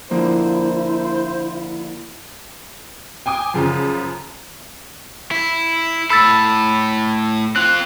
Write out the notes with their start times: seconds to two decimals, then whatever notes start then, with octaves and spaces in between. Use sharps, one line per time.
0.11 D3 F3 A#3 E4 C5
3.26 G5 G#5 D6 D#6
3.54 F#2 C#3 F3
5.31 E4
6.10 A2 A4 B5 E6 A6
7.56 C4 F4 F#6